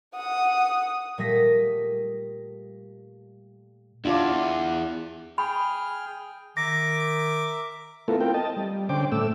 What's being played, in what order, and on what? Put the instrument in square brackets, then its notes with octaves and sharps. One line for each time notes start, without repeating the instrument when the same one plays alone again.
[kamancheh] F#5 D#6
[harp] A#2 G3 A3 D#6 A#6 B6
[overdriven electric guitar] E2 [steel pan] D4 F4 D5
[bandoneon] G#4 G5 F6 [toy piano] B5
[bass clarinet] D#3 [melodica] A#4 E5 [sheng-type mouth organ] D6 [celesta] A#6
[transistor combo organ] A3 B3 E4 F4 A4 A#4
C4 F4 A#4 G5
D#5 A5
G3
D3 C#4 C5 G5 D6
A2 A3 E6